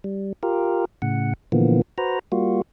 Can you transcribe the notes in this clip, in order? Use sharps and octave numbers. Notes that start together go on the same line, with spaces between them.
G3
F4 G4 A#4
A2 C#3 F#5
A#2 D3 E3 F3 A#3 B3
F#4 B4 C5 A#5
G3 A#3 F4 F#4